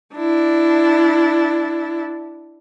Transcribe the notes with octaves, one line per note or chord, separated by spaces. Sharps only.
D4 E4